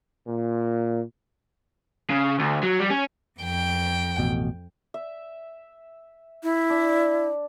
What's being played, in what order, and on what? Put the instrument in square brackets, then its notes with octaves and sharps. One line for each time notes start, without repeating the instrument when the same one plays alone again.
[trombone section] A#2
[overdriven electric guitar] C#3
D2
F#3
G3
C#4
[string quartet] F2 G5
[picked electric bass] A1 B2
[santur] E5
[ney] E4
[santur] D4